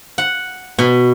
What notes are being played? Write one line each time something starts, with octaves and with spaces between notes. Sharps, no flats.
F#5
B2